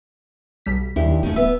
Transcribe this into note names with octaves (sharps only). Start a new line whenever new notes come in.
B1 G3 B6
D#2 D4 E4 G4
D1 C#3 A3 D#4
B3 B4 E5